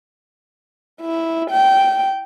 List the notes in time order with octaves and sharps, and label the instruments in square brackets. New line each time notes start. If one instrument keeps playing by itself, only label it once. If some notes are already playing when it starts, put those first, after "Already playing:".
[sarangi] E4
G5